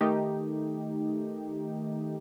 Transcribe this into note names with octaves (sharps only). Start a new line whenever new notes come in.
D#3 A3 D#4 G4